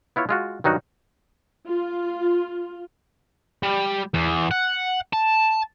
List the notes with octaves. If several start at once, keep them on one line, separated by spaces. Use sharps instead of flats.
B3 E4 F4 C#5
G#3 F4 F#4
G2 D#3 F#3 D#4 F#4
F4
G3
E2
F#5
A5